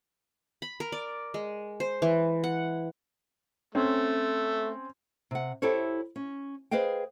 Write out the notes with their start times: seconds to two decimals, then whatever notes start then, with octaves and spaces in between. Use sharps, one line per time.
0.62 B5
0.80 A#4
0.92 D5
1.34 G#3
1.80 C5
2.02 E3
2.44 F#5
3.75 A3 C4 C#4
5.31 C3 F#5
5.62 E4 G4 A4 C5 C#5
6.16 C#4
6.71 G#4 B4 C5 D#5 F5 G5